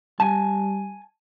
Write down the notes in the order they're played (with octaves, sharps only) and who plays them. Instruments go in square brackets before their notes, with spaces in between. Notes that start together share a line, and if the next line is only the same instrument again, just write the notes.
[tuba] G3 [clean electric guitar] G#5 A5